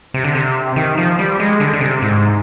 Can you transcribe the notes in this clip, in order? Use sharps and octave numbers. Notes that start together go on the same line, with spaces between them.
C3
D3
C3
D#3
F3
G3
G#3
D3
D3
C3
G#2